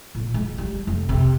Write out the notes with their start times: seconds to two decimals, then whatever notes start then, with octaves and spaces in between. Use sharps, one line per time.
0.15 A#2
0.34 G#3
0.58 G3
0.87 F1
1.09 C3